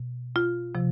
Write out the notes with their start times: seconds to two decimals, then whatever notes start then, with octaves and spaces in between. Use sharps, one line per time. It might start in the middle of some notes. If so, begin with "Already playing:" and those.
Already playing: B2
0.36 F4
0.75 C3 F3